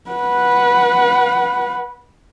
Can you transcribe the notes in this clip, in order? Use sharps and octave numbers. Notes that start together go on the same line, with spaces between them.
B4 F#5